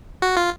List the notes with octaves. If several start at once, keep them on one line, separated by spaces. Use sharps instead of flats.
F#4
F4